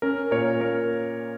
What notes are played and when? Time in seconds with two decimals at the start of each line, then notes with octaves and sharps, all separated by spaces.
0.02 C#4 A#4
0.31 A#2 A#4 C#5
0.61 A#3 A#4 C#5